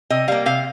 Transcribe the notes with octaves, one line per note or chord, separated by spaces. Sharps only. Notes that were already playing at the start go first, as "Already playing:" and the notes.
C3 D#5
G3 A#3 F5
C3 F5